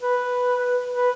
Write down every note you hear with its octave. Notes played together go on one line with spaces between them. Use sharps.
B4
B4